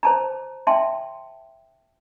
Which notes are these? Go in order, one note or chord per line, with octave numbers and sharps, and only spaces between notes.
C5 A5 A#5
E5 G5 A5 C6